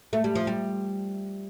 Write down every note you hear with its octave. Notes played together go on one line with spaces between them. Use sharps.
A3
G3
F3
G3